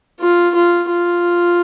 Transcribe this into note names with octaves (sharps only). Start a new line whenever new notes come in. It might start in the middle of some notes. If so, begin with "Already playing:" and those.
F4
F4
F4